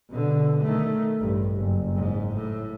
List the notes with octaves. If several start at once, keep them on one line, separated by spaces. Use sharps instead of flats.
B2 D3
D#3 A3
A1 G2
F#1
G#2
A2